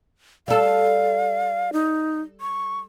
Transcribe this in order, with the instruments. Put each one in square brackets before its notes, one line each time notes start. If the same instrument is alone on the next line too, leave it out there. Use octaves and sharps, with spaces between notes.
[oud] G3 A4 [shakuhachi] F5
[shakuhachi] D#4
C#6